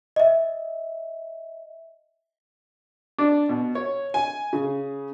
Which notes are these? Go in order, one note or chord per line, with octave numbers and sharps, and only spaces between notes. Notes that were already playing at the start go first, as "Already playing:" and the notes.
D#5 E5
D4
B2
C#5
G#5
C#3